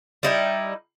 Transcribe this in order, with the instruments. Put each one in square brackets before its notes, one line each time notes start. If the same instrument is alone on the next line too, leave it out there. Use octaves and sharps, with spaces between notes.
[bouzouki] G3 D#4 E4